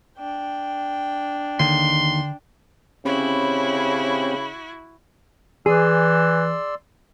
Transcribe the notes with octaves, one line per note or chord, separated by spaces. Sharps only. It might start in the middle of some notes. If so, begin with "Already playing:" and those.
D4 G5
D#2 D3 D#3 C6
C#3 C4 C#4 E4 F#4 G4 B5
E3 G#4 D5 C6 E6